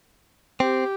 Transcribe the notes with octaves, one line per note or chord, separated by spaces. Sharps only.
C4 G4